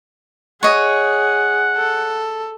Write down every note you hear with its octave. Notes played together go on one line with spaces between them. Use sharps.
G#4 C#5 D#5 F#5
A4